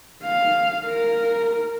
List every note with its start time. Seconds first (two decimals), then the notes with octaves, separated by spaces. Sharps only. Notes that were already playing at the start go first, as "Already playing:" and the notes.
0.23 F5
0.86 A#4